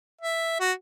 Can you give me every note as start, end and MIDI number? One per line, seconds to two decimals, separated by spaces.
0.21 0.57 76
0.60 0.72 66